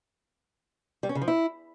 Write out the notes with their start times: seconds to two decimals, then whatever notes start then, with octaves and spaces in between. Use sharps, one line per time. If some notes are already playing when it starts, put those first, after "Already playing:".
1.03 G3
1.09 C#4
1.15 C#3
1.22 F3
1.28 E4